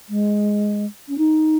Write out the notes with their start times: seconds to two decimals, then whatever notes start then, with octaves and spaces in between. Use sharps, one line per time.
0.09 G#3
1.08 C#4
1.17 D#4